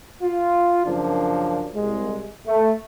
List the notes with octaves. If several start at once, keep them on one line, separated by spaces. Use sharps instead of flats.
F4
F#2 C#3 F3 A#3 D4
C2 G#3
A3